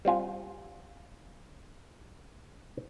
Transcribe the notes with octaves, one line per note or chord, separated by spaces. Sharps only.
G3 C4 F4 G#5